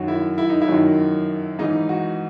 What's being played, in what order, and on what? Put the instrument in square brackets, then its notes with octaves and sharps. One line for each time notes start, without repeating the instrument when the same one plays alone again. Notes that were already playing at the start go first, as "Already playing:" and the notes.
Already playing: [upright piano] F#2 D#3 F#3 F#4
E4
E4
D#4
E4
F#2 D#3 F#3
G#2 E3 D#4
F#4